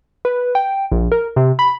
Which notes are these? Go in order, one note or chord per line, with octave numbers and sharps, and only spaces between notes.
B4
G5
A#1
A#4
C3
B5